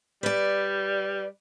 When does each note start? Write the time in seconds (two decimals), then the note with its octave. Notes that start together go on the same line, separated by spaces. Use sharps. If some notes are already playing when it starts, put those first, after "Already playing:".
0.23 G3 B4 D5